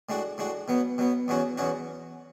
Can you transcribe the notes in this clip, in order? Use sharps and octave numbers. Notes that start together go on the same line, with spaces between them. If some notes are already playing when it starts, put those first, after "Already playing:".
A2 G#3 D4 F#4
A2 G#3 D4 F#4
B2 F#3 B3
B2 F#3 B3
E2 B2 F#3 C#4 F#4
E2 B2 F#3 C#4 F#4